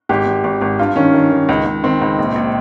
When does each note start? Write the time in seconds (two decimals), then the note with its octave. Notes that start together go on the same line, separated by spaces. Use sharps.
0.09 G#1 G4
0.26 G#1
0.44 G#1
0.62 G#1
0.79 G2 F4
0.96 D#3 C#4
1.14 D#3
1.31 D#3
1.49 C#2
1.66 C#2
1.83 D#3 C4
2.01 C#2
2.19 A#1
2.35 A#1